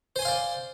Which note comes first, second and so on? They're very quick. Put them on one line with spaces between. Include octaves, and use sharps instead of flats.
C5 G#5 C6 F5 D5